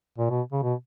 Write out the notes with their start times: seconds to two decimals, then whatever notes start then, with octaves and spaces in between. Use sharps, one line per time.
0.18 A#2
0.30 B2
0.52 C#3
0.62 B2